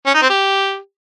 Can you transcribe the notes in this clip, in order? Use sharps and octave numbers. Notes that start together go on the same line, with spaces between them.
C#4
D#4
C4
G4